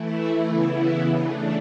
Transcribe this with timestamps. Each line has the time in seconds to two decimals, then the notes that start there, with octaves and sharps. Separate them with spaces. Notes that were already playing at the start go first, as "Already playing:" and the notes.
Already playing: E3 A3 E4
0.48 C#3 E3 B3 E4
1.12 C#3 E3 A3 D4